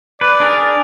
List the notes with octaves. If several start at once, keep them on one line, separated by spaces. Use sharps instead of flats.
B4 D5
D4 G#4 A#4